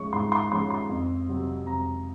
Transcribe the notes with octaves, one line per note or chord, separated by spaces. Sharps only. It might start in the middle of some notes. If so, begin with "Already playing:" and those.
Already playing: G#2 F3 G#3 C#4 C#6
G#2 C6
C6
F3 G#3 C#4 C6
C6
F2
C3 F#3 C4
F2 A#5